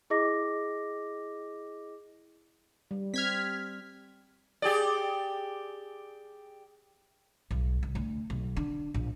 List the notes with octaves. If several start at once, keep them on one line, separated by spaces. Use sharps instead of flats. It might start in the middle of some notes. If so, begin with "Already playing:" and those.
E4 G#4 D#5 D6 A#6
G3
C4 F6 G#6 B6
G4 G#4 D5
B1
C2
D2
B1
D3
A#1